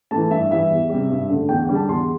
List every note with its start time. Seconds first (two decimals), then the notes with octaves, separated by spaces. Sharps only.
0.11 E3 A3 A5
0.31 G2 E5
0.51 E3 G3 E5
0.71 E2
0.90 C3 G3
1.10 G2
1.30 D3 A3
1.49 E2 G5
1.62 G5
1.69 D3 G3
1.75 A5
1.89 E2 C6